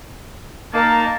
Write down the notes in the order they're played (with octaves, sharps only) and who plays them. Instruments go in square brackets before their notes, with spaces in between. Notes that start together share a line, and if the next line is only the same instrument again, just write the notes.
[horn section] A#3 [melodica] D#4 [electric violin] A5